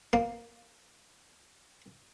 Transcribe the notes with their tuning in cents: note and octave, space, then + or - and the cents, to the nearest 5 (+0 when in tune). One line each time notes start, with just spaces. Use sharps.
A#3 +5